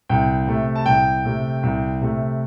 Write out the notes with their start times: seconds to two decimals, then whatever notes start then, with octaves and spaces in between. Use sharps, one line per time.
0.09 C2 G5
0.47 C3 A3
0.76 A5
0.86 C2 G5
1.25 C3 A3
1.63 C2
2.01 C3 A3